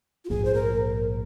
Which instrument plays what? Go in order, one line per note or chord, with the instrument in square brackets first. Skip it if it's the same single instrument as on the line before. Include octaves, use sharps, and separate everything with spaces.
[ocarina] F4
[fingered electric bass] A#1 G#2 F3 A#3 [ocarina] G#4
[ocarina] C5
A#4